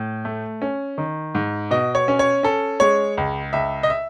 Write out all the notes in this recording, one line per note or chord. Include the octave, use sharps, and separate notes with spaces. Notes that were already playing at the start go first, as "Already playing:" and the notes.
Already playing: A2
A3
C#4
D#3
G#2
B2 D#5
C#5
C#4
C#5
C#4 A4
G#3 C#5
C#2
C#2 E5
D#5
E5